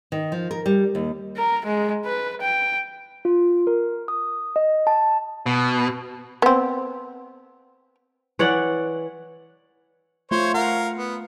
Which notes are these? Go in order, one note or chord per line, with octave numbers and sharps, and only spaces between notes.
D#3
F3
A#4
G3
D#2
A#4
G#3
B4
G5
F4
A#4
D#6
D#5
A5
B2
B3 C4
E3 C#5 D5 F#5
A3 F4 C5 C#5 C6
A#4 F5 F#5
B3